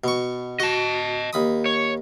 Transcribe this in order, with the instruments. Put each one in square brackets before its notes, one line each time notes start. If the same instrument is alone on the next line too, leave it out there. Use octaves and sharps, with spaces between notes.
[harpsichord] B2 C#6
[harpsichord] F#4 [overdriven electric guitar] D#5 A5
[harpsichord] D#2 B5 D#6
[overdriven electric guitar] C#5